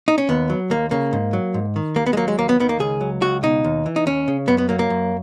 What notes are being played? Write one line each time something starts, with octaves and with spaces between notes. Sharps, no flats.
D#4
C#4
D#2 B3
F#3
D#2 A#3
C#3 A#3
G#2
F#3
G#2
D#3
D#2 A#3
B3
G#3
F#3 A#3
G#3
D#2 A#3
B3
D#3 B3
A#3
C#2 G#4
F#3
C#2 F#4
B2 D#4
D#2
E3
D#4
D#2 C#4
C#3
F#2 B3
B3
F#3 A#3
A#3
F#2